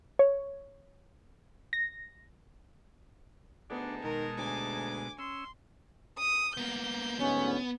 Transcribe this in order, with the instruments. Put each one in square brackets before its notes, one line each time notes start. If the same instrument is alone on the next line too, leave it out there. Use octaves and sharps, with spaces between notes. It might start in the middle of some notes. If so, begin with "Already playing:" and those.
[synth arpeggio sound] C#5
A#6
[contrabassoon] D2 [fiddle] B3 [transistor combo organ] D4 [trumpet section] D#4 G#4 A5
[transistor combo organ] B2 G#3 [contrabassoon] D#3 [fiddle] A#4
[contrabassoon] D2 [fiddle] G#5 D6
[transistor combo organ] C#4 E6 [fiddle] C6
[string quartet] D#6
[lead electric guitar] A#3 B3 [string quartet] G6
[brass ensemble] D2 G#2 C#4 [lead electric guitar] B3